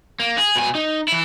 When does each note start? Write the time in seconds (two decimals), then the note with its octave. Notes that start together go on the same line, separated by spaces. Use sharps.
0.20 A#3
0.38 G#4
0.56 B2 G#5
0.75 D#4
1.08 E3 E4